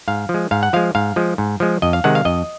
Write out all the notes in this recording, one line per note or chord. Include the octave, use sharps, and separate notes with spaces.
G#2 F5
F3
G#3
G#2 F5
F#5
F3 G#3 F5
G#2 F5
F3 G#3
G#2
F3 G#3
F2 D#5
F5
C3 D#3 G#3 F#5
F5
F2 D#5